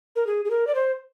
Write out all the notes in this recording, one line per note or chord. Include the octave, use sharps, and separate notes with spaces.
A#4
G#4
G#4
A#4
D5
C5